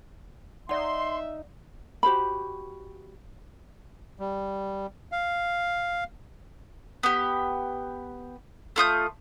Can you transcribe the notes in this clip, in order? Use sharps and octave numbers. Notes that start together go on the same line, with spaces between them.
D#4 D5 E5 F#5 C6
F#4 G4 C5 B5
G3
F5
B3 G4
A3 F4 D#6 G6